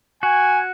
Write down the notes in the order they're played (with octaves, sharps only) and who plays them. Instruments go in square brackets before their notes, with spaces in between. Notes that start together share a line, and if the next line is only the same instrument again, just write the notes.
[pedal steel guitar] F#4 [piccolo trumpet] G#5